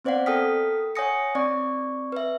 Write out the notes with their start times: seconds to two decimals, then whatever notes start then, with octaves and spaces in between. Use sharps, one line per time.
0.05 B3 C4 C5 D5 F5 F#5
0.26 A4 A#4 G5 D#6 F6 B6
0.95 C#5 F#5 G#5 D#6 A#6 C#7
1.35 C4 D5 C#6
2.12 B4 E5